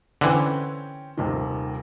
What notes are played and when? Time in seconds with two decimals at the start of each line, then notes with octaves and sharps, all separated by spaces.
0.21 D3 E3 C4 C#4 G5
1.18 D#1 C3 D#3